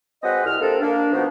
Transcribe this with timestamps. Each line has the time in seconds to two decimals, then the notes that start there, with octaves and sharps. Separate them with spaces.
0.23 G#3 C4 F#4 B4 D#5
0.45 C2 F6
0.60 C3 A#3 C4 D4 A4
0.81 A#3 D4
1.13 B2 F3 A#3 B3 D#4 F#4